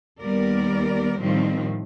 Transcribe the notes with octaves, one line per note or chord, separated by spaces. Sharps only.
D#2 G3 B3 A#4 D5
A2 D#3 F3 G3 C4